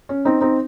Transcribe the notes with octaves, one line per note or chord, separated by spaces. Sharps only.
C#4
C4 D#4
C4 D#4